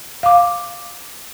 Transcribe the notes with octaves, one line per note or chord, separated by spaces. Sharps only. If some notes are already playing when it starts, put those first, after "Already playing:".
F5 D6